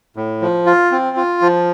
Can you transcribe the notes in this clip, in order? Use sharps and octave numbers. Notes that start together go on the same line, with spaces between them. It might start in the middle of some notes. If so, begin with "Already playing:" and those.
A2
F3
F4
C4
F4
F3